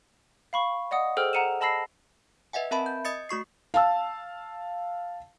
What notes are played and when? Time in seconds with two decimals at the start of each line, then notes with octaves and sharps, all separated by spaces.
0.53 F5 B5 C#6
0.91 D5 D#5 F#5 D#6
1.17 G#4 A4 C5 G5 E6 F6
1.33 F#5 A#5 C#7 D#7 E7
1.61 D#5 A5 B5 E6 A#6 C7
2.53 B4 D#5 E5 F#5 G#5
2.71 C4 A#4 E5 A5 B5
2.86 G6
3.05 D#5 D#6 A6 C#7
3.29 A3 F#4 C#6 C7
3.74 F5 A5 E6